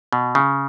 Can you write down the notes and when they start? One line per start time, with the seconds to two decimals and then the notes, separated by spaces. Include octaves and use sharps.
0.13 B2
0.35 C#3